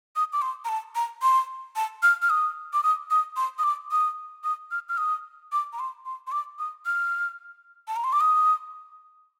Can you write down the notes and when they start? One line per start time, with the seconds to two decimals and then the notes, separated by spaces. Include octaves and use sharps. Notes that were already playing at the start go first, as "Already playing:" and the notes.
0.16 D#6
0.33 D6
0.42 C6
0.65 A#5
0.69 A5
0.95 A#5
1.22 C6
1.76 A5
2.03 F6
2.22 F6
2.30 D#6
2.73 D6
2.83 D#6
3.10 D#6
3.36 C6
3.58 D#6
3.63 D6
3.91 D#6
4.44 D#6
4.71 F6
4.89 F6
4.97 D#6
5.52 D6
5.73 A#5
5.79 C6
6.06 C6
6.27 C6
6.32 D6
6.59 D#6
6.86 F6
7.88 A5
7.96 A#5
8.04 C6
8.12 D6
8.20 D#6